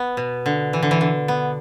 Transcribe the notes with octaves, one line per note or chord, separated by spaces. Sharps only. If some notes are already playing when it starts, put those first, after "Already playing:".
Already playing: B3
B2
D3
E3
D3
E3
D3
B3